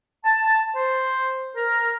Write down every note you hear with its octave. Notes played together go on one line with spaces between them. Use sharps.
A5
C5
A#4